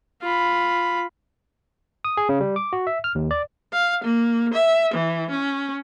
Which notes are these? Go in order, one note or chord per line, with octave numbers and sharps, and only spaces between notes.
F4 B5
D#6
G#4
C#3
G3
D6
F#4
E5
F6
D#2
D5
F5
A#3
E5
E3
C#4